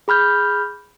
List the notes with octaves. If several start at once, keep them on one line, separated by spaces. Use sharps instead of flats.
G#4 B5 F6 G6